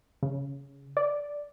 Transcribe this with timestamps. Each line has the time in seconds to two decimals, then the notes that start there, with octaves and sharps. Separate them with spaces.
0.23 C#3
0.97 D5